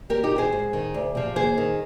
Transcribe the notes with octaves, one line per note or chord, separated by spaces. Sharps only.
D#2 G4 A#4
D#4 G4
D#3
G#4 C5
G#2
D#3
D2
C3 F3
D#2 G#4 C5
D#3